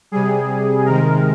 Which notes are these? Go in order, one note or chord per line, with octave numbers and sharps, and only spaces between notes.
C3 G3 G#4
C3 D#3 G#3 A#4